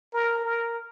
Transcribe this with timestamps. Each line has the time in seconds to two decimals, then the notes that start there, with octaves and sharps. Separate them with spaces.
0.13 A#4
0.44 A#4